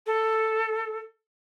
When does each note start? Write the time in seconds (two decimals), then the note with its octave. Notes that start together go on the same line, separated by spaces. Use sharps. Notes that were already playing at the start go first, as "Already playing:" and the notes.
0.06 A4